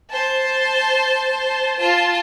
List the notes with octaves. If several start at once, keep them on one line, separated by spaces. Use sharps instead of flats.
C5 A5
F4 A5